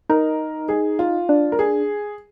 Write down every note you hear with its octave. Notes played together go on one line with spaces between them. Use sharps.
D#4 A#4
G#4
F4
D4
A#4
G#4